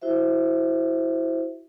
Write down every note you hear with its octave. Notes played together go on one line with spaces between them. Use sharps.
E4 F#4 C5 E5